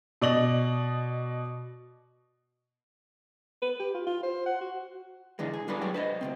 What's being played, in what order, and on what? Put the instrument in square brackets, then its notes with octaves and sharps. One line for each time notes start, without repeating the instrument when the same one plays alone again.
[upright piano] B2 D5 D#5 F#7
[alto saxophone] B4
G4
F4
F4
C5
F#5
F#4
[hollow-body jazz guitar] D3 E3 G#3
G#4
G3 D4 F4 A4 B4
F#3 G#3 D4 F#4 G4
B4 C5 D#5
C#2 G2 C4